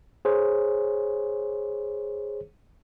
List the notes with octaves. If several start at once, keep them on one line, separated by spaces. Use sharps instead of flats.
G#4 C5 C#5